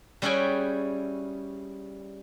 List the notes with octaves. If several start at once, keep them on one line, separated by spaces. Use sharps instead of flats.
G3 C#4 E4 F#4 G#4 G5